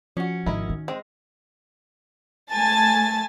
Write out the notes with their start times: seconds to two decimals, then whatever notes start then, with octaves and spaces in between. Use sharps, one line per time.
0.17 F3 C#4 F#4
0.46 G#1 D#3 E4 A#4 D#5
0.70 D#3
0.88 G#3 C4
2.53 A3 G#5 A5 A6